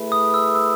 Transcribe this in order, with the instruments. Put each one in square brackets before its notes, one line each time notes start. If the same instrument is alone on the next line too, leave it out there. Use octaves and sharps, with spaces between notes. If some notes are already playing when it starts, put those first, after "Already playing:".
Already playing: [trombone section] A3 E4 G#4 B4
[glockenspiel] D#6
E6
E6